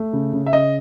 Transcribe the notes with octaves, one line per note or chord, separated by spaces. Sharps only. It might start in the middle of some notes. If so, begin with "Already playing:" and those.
Already playing: A3
C#3
C#3
E5
C#3 D#5